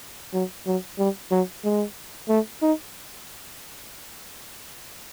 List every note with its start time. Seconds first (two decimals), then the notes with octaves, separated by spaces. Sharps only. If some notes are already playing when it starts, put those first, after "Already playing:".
0.34 F#3
0.67 F#3
0.99 G3
1.32 F#3
1.64 G#3
2.29 A3
2.62 D#4